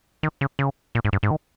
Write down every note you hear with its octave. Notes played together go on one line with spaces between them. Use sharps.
D#3
C#3
C#3
A#2
G#2
G2
G#2
D#3